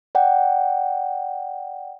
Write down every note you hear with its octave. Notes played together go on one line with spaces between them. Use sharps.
D5 F#5 G5